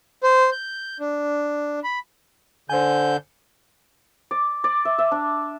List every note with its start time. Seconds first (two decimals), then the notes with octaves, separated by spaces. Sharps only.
0.24 C5
0.52 G6
1.00 D4
1.84 B5
2.70 D3 C5 G#5 G6
4.31 D5
4.64 D5
4.85 E5
4.98 E5
5.11 D4